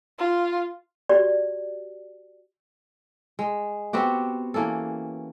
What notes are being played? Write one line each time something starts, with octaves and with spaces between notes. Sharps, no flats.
F4
F#4 G4 D5
G#3
B3 C4 F#4 G4
E3 A#3 C#4 A4